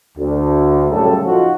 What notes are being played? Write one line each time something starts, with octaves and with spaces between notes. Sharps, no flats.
D2
F#2 A2 C#3 G3 A4
F3 D#4 F4 F#4